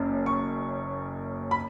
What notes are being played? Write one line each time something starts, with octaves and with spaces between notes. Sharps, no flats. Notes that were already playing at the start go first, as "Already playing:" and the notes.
Already playing: F#1 F#2
C#6
B5